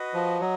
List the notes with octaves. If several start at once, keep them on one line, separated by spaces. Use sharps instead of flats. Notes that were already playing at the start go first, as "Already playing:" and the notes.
Already playing: F#4 B4 D#5
F3
F#3 D#5